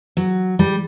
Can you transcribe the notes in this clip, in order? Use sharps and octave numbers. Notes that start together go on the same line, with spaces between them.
F#3
G3